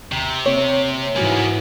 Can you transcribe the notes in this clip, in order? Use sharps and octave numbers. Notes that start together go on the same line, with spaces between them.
D#2 C3 A#5
A#3 C4 C#5
G#2 E3 A#3 B3 D#4 F#4 G#5